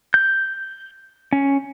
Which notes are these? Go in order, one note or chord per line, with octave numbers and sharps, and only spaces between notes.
G6
C#4